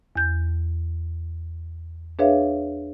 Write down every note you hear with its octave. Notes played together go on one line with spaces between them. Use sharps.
E2 G6
D4 G#4 B4 C#5 E5 F5